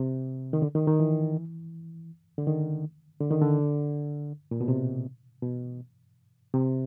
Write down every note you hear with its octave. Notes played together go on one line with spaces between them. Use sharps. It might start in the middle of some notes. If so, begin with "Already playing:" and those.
Already playing: C3
D#3
D3
D#3
D#3
E3
D3
D#3
D3
D#3
D3
A#2
B2
C3
B2
C3